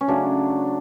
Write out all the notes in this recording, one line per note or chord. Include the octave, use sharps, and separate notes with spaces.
C#4
C#3 F#3 A3 D4